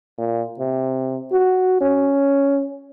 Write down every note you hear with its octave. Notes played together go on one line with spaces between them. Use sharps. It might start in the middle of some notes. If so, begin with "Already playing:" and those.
A#2
C3
F#4
C#4